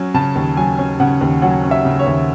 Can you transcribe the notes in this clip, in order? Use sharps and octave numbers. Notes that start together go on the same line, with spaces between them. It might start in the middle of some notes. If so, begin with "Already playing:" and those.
Already playing: F#3 C#4
C#3 A5
D#2
F#3 G#5
C#4
C#3 F#5
D#2
F#3 F#5
C#4
E5
C#3
C#5
D#2